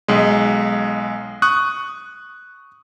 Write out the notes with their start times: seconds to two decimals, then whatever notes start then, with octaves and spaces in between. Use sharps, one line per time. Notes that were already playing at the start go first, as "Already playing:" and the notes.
0.08 B1 G#3
1.42 C#6 D#6 F#6